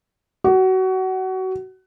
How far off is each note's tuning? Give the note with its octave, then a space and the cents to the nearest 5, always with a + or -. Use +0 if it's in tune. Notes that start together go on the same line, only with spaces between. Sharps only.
F#4 +25